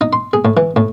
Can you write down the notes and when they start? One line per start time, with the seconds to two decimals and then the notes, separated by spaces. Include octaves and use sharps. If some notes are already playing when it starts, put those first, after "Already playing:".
0.01 D#4
0.13 C6
0.33 G#4
0.45 A2
0.57 E3
0.76 A2